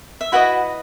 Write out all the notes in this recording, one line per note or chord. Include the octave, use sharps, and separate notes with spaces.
E5
E4 F#4 B4 D#5 F#5